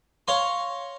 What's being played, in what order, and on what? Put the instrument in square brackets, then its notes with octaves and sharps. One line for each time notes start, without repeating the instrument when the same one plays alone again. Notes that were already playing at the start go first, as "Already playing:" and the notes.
[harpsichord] C#5 F5 A#5 C6